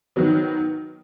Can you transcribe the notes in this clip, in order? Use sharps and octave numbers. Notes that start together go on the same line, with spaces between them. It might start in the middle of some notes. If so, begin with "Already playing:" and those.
D#3 F#3 B3